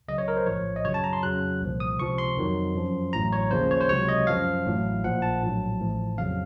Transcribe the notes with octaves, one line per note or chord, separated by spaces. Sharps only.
C#2 C#3 F#3 D#5
C#5
A#4
C5
A#1 A2 F3 C#5
D#5
F#2 C#3 F#3 C#5
A5
A#5
C6
F2 C#3 F#3 F#6
C2 A#2 F3
D#6
C#2 C3 F3 C#6
C6
F2 D#3 F#3
F#2 F3
A1 A2 F#3 A#5
C#5
D#2 C#3 F3 C5
C#5
C5
C#2 C3 F#3 C#5
D#5
F#2 F3 F5
A1 A2 F#3
A#1 A#2 F3 F#5
A5
A#1 A2 F#3
A1 A2 F3
F2 C#3 F#3 F5